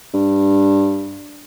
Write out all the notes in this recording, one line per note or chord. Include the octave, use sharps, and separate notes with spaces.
G2